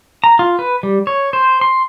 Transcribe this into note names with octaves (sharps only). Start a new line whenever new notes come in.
A#5
F4
B4
G3
C#5
C5
C6